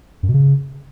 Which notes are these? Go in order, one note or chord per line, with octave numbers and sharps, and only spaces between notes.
F#2
B2
C#3